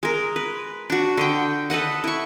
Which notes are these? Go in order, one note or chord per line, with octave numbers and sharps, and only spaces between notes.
G#3 A#4
B4
D4 F#4
D3 D#5 G5
A4 B4 D#5 F#5
E4 C#6